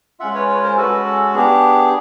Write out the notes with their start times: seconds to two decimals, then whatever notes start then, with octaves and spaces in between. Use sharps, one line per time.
0.20 G#3 C#4 F4 E5 F#5
0.35 B4 C#5
0.49 B4 C#5
0.63 A#4 C5
0.77 G#3 C#4 F#4 A4 B4
1.06 A4
1.34 B3 D4 G4 G#4